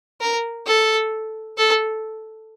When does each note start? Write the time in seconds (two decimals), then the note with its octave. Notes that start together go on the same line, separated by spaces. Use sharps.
0.21 A#4
0.67 A4
1.58 A4